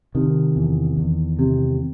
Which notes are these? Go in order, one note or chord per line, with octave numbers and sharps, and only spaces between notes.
C3 D#3
E2
E2
C3